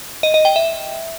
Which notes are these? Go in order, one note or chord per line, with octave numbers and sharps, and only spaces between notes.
D#5
D#5
G5
E5